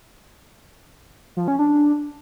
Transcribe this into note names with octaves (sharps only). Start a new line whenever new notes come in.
F3
C#4
D4